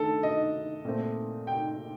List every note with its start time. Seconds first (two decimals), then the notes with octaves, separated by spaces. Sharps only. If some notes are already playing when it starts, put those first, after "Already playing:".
Already playing: D#3 A3 D4 A4
0.23 D#5
0.85 A#2 A3 C4
1.47 G5